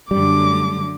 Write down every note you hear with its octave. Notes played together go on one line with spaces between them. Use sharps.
F#2 D3 G3 A3 D6